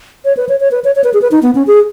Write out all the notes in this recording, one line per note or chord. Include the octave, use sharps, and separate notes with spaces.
C#5
B4
C#5
C#5
B4
C#5
C#5
B4
G#4
B4
D#4
B3
C#4
G#4